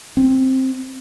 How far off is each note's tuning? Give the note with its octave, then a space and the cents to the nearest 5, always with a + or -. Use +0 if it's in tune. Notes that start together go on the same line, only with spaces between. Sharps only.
C4 +5